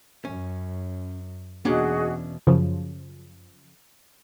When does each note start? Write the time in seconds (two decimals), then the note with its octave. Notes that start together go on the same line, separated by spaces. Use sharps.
0.25 F#2 C#4
1.65 E2 B2 A#3 C#4 D4 F#4 G#4 D#5
2.47 F#2 C#3 F3